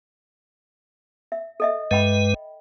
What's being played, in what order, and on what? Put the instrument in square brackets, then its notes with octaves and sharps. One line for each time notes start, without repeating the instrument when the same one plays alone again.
[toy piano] E5
A4 D#5 E5
[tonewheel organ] G2 G#3 B4 [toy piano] D#5 G5 B5